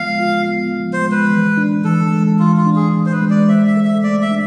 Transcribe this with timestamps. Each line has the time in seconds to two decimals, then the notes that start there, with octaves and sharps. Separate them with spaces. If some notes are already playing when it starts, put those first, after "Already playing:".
Already playing: F3 G#3 B3 F4 F5
0.20 F4
0.48 B3
0.74 F3
0.93 C5
1.02 G#3
1.11 B4
1.30 E3
1.57 D4
1.85 E3 A4
2.12 G#3
2.39 E3 F4
2.57 F4
2.66 D4
2.76 G#4
2.94 E3
3.06 C5
3.12 B4
3.21 G#3
3.30 D5
3.49 C5 E5
3.67 E5
3.77 A4
3.85 E5
4.03 A3 D5
4.22 E5
4.31 D4